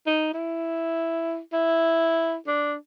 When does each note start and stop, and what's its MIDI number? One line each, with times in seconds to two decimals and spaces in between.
0.06 0.29 63
0.34 1.39 64
1.53 2.35 64
2.47 2.75 62